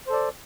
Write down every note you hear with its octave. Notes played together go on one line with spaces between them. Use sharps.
A4 C5 D5